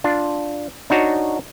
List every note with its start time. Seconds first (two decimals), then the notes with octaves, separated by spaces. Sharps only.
0.04 D4 F4
0.90 D4 D#4 F#4 C#5